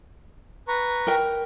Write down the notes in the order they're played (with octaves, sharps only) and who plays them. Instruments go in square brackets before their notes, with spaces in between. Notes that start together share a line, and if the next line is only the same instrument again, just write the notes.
[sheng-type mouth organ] B4 A#5 C#6
[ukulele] A#4 G5